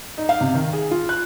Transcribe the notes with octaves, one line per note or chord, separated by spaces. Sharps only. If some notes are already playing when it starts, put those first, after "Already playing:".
D#4
F5
C3
D#3
G#4
F4
F#6